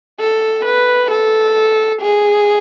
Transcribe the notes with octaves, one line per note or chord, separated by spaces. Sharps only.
A4
B4
A4
G#4